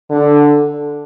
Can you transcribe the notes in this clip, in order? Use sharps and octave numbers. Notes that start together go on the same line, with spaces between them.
D3